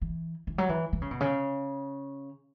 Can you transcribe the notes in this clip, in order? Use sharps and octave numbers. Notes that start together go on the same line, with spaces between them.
E3
E3
F#3
E3
E3
C#3
B2
C#3